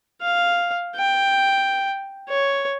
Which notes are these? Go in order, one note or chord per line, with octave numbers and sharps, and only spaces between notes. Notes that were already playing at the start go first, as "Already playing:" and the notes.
F5
G5
C#5